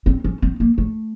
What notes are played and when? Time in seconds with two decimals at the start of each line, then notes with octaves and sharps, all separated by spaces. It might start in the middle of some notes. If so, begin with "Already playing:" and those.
0.06 C4
0.24 C#4
0.42 C4
0.60 A#3
0.78 A3